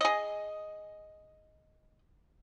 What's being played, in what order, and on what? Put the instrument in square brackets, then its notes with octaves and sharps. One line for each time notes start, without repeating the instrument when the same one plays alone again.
[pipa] G#4 D#5